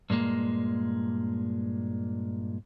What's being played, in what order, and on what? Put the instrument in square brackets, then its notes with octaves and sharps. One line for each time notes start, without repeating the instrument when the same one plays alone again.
[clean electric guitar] G2 A#2 G#3 A#3